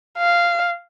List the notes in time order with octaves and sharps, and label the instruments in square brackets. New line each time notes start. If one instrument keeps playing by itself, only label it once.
[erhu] F5